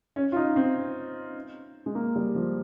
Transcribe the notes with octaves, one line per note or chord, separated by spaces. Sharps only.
C#4
F4
D#4
C4
G#3
A#3
G3
F3